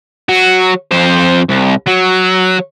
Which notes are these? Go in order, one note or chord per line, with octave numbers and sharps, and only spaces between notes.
F#3 F#4
F2 C5
C2
F#3